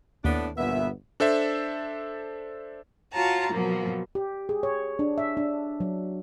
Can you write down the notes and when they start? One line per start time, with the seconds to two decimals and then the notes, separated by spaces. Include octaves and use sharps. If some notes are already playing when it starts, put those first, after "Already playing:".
0.24 D#2 A2 B3 D4
0.57 G1 A#2 B3 E5
1.20 D4 A4 C5 E5
3.13 F4 F#4 C#5 A5 A#5
3.52 B2 F3 F#3 A#3
4.15 G4
4.49 G#4
4.63 C#5
4.99 D4
5.18 E5
5.37 D4
5.80 F#3